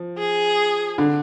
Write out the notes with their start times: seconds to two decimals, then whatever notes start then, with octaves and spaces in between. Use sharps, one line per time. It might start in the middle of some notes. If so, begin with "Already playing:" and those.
Already playing: F3
0.18 G#4
0.98 D3